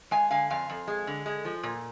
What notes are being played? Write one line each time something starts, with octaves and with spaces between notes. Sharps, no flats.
G#3 F5 G#5
D3 F5 G#5
F2 F5 G#5
F2
G#3
D3
G#3
F3
A#2